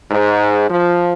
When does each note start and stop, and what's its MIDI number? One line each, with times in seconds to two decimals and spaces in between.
0.10 0.69 44
0.69 1.13 53